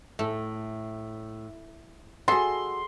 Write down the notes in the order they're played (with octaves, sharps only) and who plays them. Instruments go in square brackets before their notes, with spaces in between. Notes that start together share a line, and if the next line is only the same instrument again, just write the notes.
[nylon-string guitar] A2 [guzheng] A3
[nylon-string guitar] F#4 D#5 [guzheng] G#4 A4 [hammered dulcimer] C6